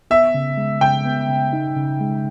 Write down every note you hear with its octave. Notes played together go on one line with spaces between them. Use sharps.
B3 E5
C#3
G#3
C#3 G5
B3
C#3
D#4
C#3
G#3